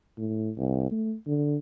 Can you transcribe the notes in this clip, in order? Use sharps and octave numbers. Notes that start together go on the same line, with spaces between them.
A2
C2
A3
D3